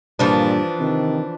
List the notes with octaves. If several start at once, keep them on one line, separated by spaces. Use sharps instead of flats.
G2 A#2 E3 F3 D4
C3 D#3